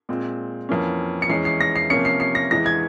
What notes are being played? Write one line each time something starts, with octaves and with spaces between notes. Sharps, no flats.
A#2 G#3 C4
F2 E3 A#3 C#4
C#7
E2 E3 G#3 C#4 C7
C7
A#6
C7
C3 F3 A#3 C#4 C#7
C7
C7
A#6
E2 E3 G#3 A#6
G#6